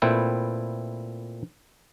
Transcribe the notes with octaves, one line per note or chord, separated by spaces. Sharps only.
A#2 A3 C4 E4 B4 G5